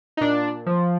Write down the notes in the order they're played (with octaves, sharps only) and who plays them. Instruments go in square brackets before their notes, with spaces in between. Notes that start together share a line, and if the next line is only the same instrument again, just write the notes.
[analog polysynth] D#4
A#2 D4
F3